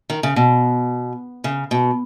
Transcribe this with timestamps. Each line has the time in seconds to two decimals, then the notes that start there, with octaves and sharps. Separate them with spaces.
0.10 D#3
0.23 C#3
0.36 B2
1.44 C#3
1.71 B2